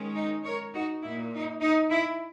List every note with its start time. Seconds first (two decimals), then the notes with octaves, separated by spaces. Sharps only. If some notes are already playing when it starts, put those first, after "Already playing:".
Already playing: D#3 G#3 C#4
0.16 D#4
0.45 A#4 C#5
0.74 D#4 F#4
1.03 A#2 A#3 D#4 E4
1.33 D#4
1.62 D#4
1.91 E4